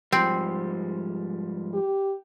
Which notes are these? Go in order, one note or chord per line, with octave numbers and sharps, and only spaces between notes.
G#2 F3 G3 C4
G4